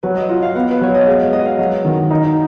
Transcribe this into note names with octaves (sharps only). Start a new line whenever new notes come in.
F#3 B4
D#5
F4 F#5
F5
B3 F#5
B4
F#3 C#5
D#5
G#3 F5
F#4 D#5
F5
F#3
D#3
D#4